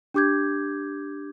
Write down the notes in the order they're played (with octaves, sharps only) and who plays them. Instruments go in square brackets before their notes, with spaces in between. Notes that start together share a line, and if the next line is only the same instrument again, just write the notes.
[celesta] D4 G4 D6 G6 G#6